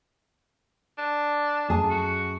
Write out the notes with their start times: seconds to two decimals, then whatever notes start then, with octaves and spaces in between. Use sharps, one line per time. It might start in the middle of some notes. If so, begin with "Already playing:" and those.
0.98 D4
1.68 F#2 G#4 A5
1.90 F#4